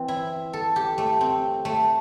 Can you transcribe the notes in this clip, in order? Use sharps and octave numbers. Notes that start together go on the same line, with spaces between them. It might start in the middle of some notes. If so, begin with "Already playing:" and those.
Already playing: E3 C4
E4
A4
G4
A3
C4
A3